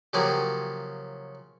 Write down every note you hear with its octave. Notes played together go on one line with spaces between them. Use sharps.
C#3 F3 F#3 A#3 G4 G#4